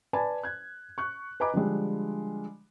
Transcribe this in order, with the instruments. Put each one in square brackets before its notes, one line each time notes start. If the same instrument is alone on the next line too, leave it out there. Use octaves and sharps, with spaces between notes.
[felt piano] B4 D5 G#5 A5 B5
F#6 G#6
C#6 F#6
B4 D#5 G#5 A#5 B5 D6
D3 F3 G3 G#3